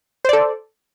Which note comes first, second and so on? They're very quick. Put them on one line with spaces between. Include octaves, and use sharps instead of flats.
C5 D5 A4